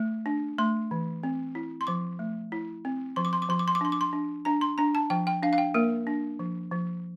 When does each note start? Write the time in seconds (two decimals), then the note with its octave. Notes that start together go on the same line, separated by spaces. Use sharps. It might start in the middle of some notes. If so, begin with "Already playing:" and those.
Already playing: A3
0.26 D4
0.58 A3 C6
0.91 E3
1.23 C4
1.55 E4
1.81 C6
1.87 F3 D6
2.19 A3
2.52 E4
2.85 C4
3.16 F3 C6
3.25 D6
3.33 C6
3.42 D6
3.49 F3 C6
3.59 D6
3.68 C6
3.75 D6
3.81 D4 C6
3.92 D6
4.01 C6
4.13 D4
4.45 D4 A#5
4.61 C6
4.78 D4 A#5
4.95 A5
5.10 F3 G5
5.27 G5
5.43 D4 F5
5.53 F5
5.58 G5
5.74 A#3 A#4
6.07 D4
6.39 F3
6.71 F3